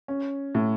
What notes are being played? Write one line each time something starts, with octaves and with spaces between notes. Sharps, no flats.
C#4
A2